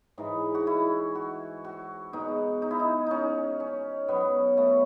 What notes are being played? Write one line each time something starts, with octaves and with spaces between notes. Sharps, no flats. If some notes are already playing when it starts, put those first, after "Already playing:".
G#2 E3 G#3 D#4
F#4
E4
F#4
F#4
B2 G#3 D#4
D#4
E4
D#4
C#4 D#4
C#4
B2 F#3 B3
A3